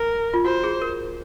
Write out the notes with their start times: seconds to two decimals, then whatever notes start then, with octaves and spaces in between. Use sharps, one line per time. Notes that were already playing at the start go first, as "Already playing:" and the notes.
Already playing: A#4
0.34 F4
0.44 F#4 C5
0.64 G#4
0.82 A#4